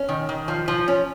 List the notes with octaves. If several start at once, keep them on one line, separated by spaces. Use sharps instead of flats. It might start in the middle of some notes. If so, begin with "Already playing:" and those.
Already playing: C#4
D#3
D#3
F3
F3
C#4